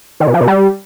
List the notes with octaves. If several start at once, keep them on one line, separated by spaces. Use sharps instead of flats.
D#3
B2
F3
B2
G3